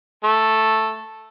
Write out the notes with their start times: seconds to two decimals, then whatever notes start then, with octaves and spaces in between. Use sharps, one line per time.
0.24 A3